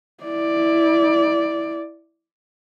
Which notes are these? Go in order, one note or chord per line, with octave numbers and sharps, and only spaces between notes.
E4 D5